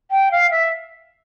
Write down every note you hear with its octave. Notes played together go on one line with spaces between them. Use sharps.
G5
F5
E5